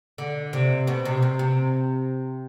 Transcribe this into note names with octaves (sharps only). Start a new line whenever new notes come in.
D3
C3
B2
C3
C3
C3